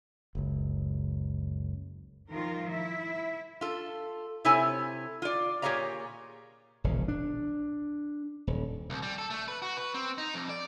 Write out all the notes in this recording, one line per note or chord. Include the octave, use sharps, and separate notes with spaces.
F#1 C#2
D#3 F3 G3 F4 A#4
E4 E5
F4 A4
C3 E4 A4 C#5 G#5
F4 D5
A#2 G4 G#4 C#5 F5 A#5
E1 A#1 C#3
D4
D#1
C2
G3
A4
A3
B4
F#4
B4
C4
D#4
F2
D5